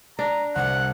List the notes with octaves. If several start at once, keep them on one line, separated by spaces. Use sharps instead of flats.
D4 A#5
C2 F#5 F#6